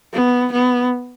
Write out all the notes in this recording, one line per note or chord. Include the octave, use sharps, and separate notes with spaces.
B3
B3